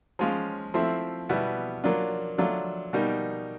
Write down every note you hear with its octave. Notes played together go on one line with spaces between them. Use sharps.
F3 G#3 C#4 F4
F3 A3 C4 E4
B2 G3 B3 E4
F#3 A#3 D4 F4
F#3 A3 D4 F4
B2 G3 A#3 D#4